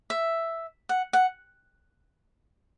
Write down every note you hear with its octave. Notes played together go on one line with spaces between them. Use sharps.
E5
F#5
F#5